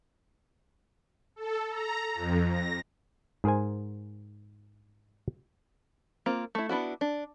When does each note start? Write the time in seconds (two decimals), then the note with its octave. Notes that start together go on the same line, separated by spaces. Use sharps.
1.36 A4
1.70 A#5
2.14 F2
2.49 A#6
3.44 G#2 G#4 A#4 C5 G#5
6.26 A#3 C4 F4
6.55 A3 E4
6.69 B3 D4 E4 F#4
7.01 D4